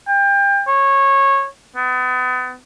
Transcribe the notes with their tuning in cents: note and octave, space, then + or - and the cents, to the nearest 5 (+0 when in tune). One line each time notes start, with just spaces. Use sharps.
G5 +30
C#5 -20
B3 +35